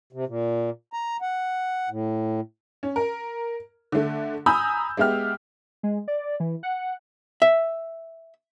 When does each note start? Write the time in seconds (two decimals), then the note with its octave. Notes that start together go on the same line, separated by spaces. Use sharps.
0.13 C3
0.27 A#2
0.93 A#5
1.22 F#5
1.90 A2
2.83 C#4
2.96 A#4
3.92 D3 A3
4.46 G#5 A#5 B5 D#6 E6 G6
4.97 G#3 B3 G4 E5 F6
5.83 G#3
6.08 D5
6.40 E3
6.63 F#5
7.42 E5